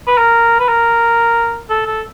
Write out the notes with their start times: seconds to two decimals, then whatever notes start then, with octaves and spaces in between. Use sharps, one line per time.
0.07 B4
0.18 A#4
0.60 B4
0.69 A#4
1.70 A4
1.86 A4